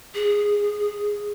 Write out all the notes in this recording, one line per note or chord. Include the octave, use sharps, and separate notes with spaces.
G#4